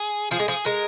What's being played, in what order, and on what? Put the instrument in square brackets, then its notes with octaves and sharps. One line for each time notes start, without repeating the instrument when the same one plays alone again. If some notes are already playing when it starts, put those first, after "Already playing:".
Already playing: [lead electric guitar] G#4
[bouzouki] F3 [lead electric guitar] G#4
[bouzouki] G#3
[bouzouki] F3 [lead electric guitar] G#4
[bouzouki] G#3 [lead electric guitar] A#4